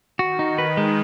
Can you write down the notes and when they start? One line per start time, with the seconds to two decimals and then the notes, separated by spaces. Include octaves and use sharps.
0.19 D#3 F#4
0.39 D#4
0.58 B4
0.77 G#3